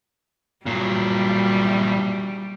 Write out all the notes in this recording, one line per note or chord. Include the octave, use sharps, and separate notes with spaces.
A#2 F#3 G3